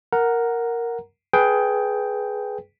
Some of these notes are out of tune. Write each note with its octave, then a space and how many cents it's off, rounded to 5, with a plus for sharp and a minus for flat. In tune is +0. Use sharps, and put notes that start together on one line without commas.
A#4 +0 F#5 +0 A#5 +0
G#4 +15 B4 +0 G5 +0